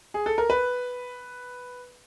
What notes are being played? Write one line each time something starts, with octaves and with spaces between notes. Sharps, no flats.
G#4
A4
A#4
B4